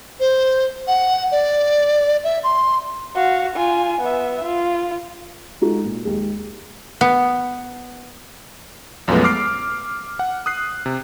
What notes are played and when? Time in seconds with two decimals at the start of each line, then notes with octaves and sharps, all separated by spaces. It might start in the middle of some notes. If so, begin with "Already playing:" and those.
0.20 C5
0.88 F#5
1.32 D5
2.24 E5
2.44 C6
3.15 F#4 F5
3.56 F4 G#5
4.01 B3 E5
4.44 F4
5.61 G#3 D#4 F4 F#4 A4
5.85 A#2
6.05 D#2 G#3 G#4
7.01 B3
9.08 B1 F#2 F3 G#3 A3 B3
9.24 D6 F6 C7 D7
10.19 F#5
10.46 D#6 F#6 C7
10.86 C3